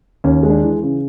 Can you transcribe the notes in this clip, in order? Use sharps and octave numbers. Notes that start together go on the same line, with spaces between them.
D#2 C#4
G#3
D4
E3
C#3